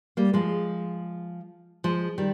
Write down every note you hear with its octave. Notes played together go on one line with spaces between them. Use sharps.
G3 A#3
F3 G#3
F3 G#3
D#3 G3